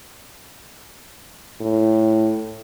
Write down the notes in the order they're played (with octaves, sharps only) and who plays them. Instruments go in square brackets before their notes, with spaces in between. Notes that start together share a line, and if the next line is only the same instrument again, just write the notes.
[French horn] A2